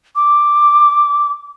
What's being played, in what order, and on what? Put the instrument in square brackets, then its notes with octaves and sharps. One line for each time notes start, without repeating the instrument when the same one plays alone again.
[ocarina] D6